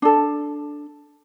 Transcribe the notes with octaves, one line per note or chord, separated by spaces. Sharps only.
D4 A4